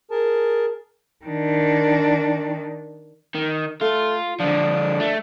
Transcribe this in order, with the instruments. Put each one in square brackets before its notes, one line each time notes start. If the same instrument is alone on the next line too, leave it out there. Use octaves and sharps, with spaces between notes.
[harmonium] G#4 A#4 A5
[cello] D#3 D4
[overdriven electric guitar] D#3
[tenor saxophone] A3 [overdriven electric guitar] F4
[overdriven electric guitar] D3 F3 [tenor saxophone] D4
[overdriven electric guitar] A3